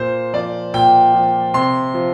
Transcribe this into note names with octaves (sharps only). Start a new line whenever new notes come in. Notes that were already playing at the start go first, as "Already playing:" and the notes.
Already playing: A#2 C5
F3 D5
A#2 G5
F3
C3 C6
F3